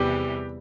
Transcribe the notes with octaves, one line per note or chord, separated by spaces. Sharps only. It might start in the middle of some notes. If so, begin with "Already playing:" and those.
Already playing: E2 C3 E3 G3 G4